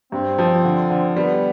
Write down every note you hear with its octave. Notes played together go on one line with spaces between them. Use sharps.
G2 C4
F3
D3
D3
G3 B3